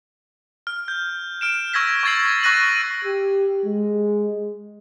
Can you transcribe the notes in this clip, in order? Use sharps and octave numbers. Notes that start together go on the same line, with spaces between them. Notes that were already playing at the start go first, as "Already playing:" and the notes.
F6
G6
F6 D7 E7
C#6 E6 G#6 A#6 B6
C#6 G#6 A6 C7 F#7
C#6 E6 F#6 A#6 D#7 F#7
G4
G#3